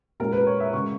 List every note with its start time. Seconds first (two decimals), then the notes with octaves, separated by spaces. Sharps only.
0.20 A#2 G#3 C#4 A#4
0.33 B4
0.47 C#5
0.60 E5
0.73 C#3 G#3 C#4 C#6